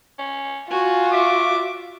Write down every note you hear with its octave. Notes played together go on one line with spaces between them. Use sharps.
C#4
F4 F#4 G#5
E5 D6